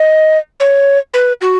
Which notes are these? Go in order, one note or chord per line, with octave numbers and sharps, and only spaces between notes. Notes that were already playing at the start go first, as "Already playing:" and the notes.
Already playing: D#5
C#5
B4
F#4